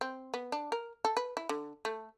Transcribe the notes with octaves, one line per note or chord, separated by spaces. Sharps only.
C4
B3
D4
A#4
A4
B4
E4
D3
A3